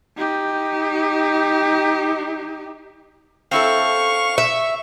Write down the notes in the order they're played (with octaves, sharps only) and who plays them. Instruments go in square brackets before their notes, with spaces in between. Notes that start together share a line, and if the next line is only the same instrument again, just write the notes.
[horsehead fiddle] D#4 G4
[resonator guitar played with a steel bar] C4 E4 A4 [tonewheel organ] F5 [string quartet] C#6
[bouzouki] E5